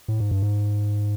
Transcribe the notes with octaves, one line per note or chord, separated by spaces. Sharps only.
A2
G#2
G2
G#2